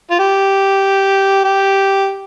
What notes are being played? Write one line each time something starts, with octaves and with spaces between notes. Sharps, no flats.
F4
G4
G4